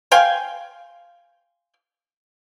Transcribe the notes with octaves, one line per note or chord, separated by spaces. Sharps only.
F5 G5 G#5 C6